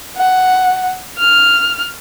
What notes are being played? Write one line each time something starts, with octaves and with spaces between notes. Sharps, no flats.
F#5
F6